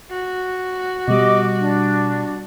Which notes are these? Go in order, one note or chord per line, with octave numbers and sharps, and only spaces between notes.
F#4
B2 G3 D#5 D6
D4